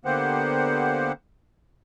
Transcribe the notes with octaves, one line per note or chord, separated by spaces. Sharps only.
D3 A#3 B3 G4 C5 F#5